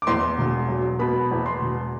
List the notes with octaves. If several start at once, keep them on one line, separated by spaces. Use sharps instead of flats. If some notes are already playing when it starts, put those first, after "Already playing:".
D6
E2 C6
E1
F#3
B2 B5
E2
C6
E1